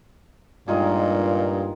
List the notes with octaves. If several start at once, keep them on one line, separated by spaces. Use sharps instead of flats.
G2 A#2 D#3 G#3 F4 G#4